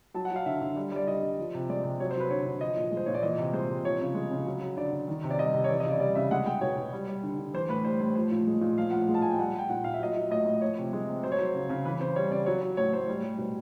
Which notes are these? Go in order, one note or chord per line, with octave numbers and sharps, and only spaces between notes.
F#3 A5
F#5
F#3
F5
D3 E5
D3
G3
G3 D5
D3 D#5
D3
F3
C3
G#3 D5
C3
F#3 C#5
C5
F#3 B4
D3 C#5
D3
F3 D#5
A#2
G#3
C5
A#2 C#5
D5
E3 D#5
C3
G#3 C5
C3
F3 C#5
C#3
G#3
C#3
F#3
F#3
D3 D5
D3
D#3
C3
D5
G3 D#5
C3
C#5
E3 D5
D#5
C#3 D5
G3 D5
C#3 E5
G#3 F#5
G#3 G5
B2 C#5
B2
G3
G3
D3
D3
E3 C5
A2 B4
G3 C5
A2 C5
F3 C5
A#2
G#3
A#2
F3 F5
A2 F#5
F5
G#3
A5
A2 G#5
G5
G3 F#5
G3 G5
A#2 F#5
A#2 F5
E5
F#3 D#5
E5
F#3
A2 D#5
A2
F3 C#5
C3
G#3
C3
F#3 C5
C#5
F#3 C5
C#3
C#3
E3 B4
C#3 C5
G3 C#5
C#3 D5
F#3 C#5
F#3
A2 C#5
A2 C5
G3
G3
B2